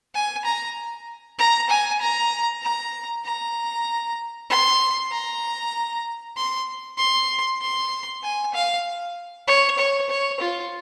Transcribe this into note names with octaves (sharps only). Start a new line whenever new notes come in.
G#5
A#5
A#5
G#5
A#5
A#5
A#5
C6
A#5
C6
C6
C6
G#5
F5
C#5
C#5
C#5
F4